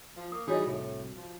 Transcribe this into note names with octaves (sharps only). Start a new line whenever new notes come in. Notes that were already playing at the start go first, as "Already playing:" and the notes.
F3
A#3 D#6
E3 G3 D4 D#4 F#4 G#4 C#5
C2 A2
F3